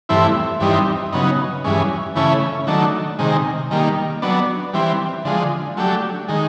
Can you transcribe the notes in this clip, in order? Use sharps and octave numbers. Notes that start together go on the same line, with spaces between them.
G2 E3 A3 C4 E4
G2 E3 G3 C4 D#4
C#3 F#3 B3 D#4
G2 E3 G#3 C#4
C#3 E3 A3 C#4 E4
D#3 F#3 A3 D4
C3 D#3 G#3
D#3 G3 A#3
F#3 B3 D4
E3 G3 C4
D3 F3 G#3
F#3 A3 D4 G4
D#3 G#3